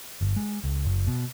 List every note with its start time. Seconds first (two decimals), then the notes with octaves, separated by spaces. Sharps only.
0.21 G1
0.36 G#3
0.64 C#2
0.85 F#1
1.07 B2